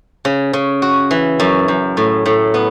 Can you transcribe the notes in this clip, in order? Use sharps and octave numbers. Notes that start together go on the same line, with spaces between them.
C#3
C#3
F#4
E3
F#2
F#2
A2
A2
B3